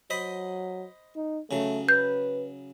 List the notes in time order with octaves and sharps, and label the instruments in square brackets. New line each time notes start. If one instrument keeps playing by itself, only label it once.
[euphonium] F#3 [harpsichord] C5 D#5 B5
[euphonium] D#4
[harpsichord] C#3 F#3 [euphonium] A3
[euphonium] B4 [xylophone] G6